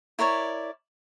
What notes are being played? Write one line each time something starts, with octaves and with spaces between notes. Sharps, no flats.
E4 A#4 C#5 D5